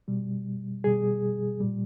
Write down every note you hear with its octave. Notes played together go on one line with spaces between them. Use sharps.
B2 G3
B2 G3 G#4
A#2 G3